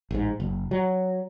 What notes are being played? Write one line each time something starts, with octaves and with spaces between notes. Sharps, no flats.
A1 G#2
F#1
F#3